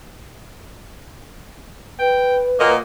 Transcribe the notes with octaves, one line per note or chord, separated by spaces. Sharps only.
B4 G5
A#2 F#3 A#3 D#5